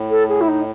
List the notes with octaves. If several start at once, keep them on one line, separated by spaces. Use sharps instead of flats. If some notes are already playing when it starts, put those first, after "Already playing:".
Already playing: A2
A4
G#4
E4
D#4